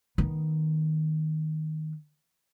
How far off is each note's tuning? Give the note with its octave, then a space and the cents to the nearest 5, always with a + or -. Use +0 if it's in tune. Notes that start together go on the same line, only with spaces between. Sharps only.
D#3 +0 B3 +0